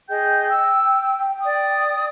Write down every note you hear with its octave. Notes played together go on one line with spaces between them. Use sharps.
G#4 D#5 G5 G6
E6
D5 D#6